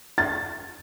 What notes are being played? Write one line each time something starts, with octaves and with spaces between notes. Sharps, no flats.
A6